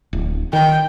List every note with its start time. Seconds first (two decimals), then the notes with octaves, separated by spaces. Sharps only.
0.13 D1
0.53 D#3 G5